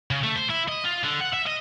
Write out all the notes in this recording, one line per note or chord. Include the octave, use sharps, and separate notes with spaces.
C#3
A3
C5
E4
D#5
F4
D3
F#5
E5
D#5